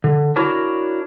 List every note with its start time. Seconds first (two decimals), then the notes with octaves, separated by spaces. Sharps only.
0.04 D3
0.36 D4 E4 F#4 A#4 C#5